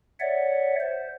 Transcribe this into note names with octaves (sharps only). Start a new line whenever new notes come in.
C#5 D5 E5 F#5
C5